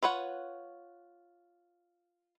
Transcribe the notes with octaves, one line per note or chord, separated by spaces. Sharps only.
F4 B4 C#5 F#5